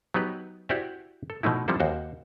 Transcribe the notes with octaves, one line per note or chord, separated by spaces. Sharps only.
F#3 B3 D#4 G4 B4
E4 F#4 G4 C5 D5 E5
A4
B2 F3 A3 D#4 E4
F3 G3 C4 E4 A4
D#2 F#4 C5